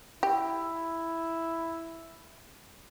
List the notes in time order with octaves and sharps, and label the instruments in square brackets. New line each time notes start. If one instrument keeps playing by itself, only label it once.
[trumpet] E4 [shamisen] G4